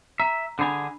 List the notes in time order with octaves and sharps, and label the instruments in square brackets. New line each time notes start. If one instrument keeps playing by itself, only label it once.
[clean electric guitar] E5 [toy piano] A#5
[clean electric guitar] D3 G#4 G#5 [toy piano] D4 B5